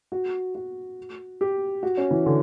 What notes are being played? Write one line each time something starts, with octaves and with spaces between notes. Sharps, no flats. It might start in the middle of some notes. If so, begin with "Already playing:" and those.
F#4
F#4
G4
F#4
C#4
E3
D3